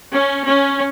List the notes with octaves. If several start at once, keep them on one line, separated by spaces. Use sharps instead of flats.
C#4
C#4